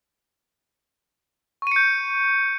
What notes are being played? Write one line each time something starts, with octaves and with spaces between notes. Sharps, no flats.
C#6 G6 C#7 D#7